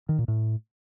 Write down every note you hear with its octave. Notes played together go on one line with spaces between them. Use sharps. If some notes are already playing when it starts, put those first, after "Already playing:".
D#3
A#2
A2